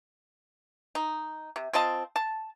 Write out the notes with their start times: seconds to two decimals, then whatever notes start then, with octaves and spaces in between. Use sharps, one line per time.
0.95 D#4
1.56 C3
1.73 C4 F4 D#5 A5
2.16 A5